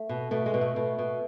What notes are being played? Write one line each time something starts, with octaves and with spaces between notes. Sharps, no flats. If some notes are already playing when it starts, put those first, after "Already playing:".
Already playing: A3
B2
B2 A3
G#3
B2
A3
B2
B2